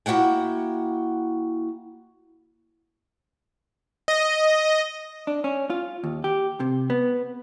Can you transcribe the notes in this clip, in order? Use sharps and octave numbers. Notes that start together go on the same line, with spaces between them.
A#3 E4 F#4 F#5 G5
D#5
D4
C#4
F4
D#2
G4
C3
B3